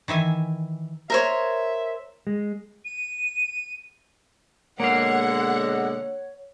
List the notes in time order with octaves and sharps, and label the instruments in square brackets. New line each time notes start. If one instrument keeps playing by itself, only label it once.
[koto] D#3 E3 E5 G#5
[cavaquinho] A#4 C5 C#5 [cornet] E5
[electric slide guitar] G#3
[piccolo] D#7
[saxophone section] B2 D3 G#3 [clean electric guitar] A#3 F5 [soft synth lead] C#5 [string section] F#5